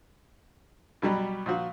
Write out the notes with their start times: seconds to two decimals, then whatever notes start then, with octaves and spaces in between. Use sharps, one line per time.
1.02 B2 F#3 G3
1.46 A#2 F3 F#4